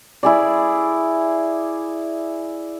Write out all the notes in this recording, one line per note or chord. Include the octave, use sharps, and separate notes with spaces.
E4 G#4 D5